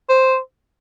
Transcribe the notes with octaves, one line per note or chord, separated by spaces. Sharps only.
C5